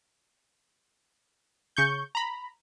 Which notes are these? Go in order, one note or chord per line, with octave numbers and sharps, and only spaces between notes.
C#3 C#6 G6
A#5 B5